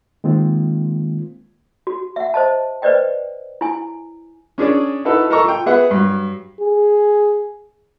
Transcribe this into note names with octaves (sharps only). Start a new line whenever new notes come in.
D#3 G#3 A#3 C4 F4
F#4
E5 F#5
C5 D#5 A5
B4 C5 D5 D#5 G5
E4 G#5
C#4 D4 G#4 D5
D#4 E4 F#4 A4 B4
A4 A#4 D#5 A#5 C#6
F4 G5
B3 G#4 B4 E5 F#5
G2 F#3
G#4